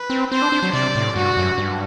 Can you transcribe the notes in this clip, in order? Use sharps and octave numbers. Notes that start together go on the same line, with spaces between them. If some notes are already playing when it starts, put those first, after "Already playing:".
Already playing: B4
C4
C4 C5
D4
D4
F#3
C3 D5
A2
G2 F#4
F#2
G2